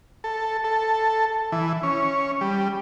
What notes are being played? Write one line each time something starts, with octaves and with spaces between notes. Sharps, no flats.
A4
A4
E3
C#4
G3